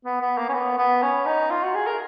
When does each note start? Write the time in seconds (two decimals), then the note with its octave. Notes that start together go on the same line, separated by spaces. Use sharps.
0.05 B3
0.21 B3
0.38 A#3
0.49 C#4
0.53 B3
0.78 B3
1.02 C#4
1.26 D#4
1.50 F4
1.63 F#4
1.75 G#4
1.87 A#4